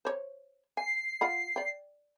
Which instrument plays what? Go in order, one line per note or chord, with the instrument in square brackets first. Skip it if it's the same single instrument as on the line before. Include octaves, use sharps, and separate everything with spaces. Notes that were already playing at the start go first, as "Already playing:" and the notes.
[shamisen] C5 C#5
[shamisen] G#5 [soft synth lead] C7
[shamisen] F4 F#5 B5
D5 G5